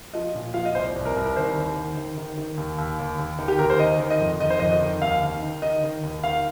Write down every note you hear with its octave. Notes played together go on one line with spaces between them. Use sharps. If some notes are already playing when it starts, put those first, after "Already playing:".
F3 D#5
A#2
F3 F5
D#5
C2 C5
C2
A#4
C2
A#4
D#3 C5
D#2
D#3
D#3
D#3
D#3
D#2
D#2
D#2
D#2
D#3
G4
D#2 A#4
C5
D#3 D#5
D#3
D#5
F2
D#3 D#5
C5
F2 D#5
D#5
D#3
D#2 F5
D#3
D#3
D#3 D#5
D#3
D#2
D#3 F5